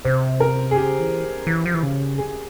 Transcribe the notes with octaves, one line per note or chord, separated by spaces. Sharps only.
C3 C5
A#4
G#4
C#3 G4
E3
E3
F3
E3
C#3
G#4